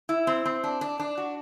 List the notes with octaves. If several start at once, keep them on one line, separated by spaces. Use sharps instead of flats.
E4
C4
C4
D4
D4
D4
F#4